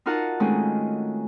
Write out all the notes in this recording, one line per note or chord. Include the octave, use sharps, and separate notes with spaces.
D#4 F4 F#4 A#4 F#5 A5
D#3 G#3 A3 C4 C#4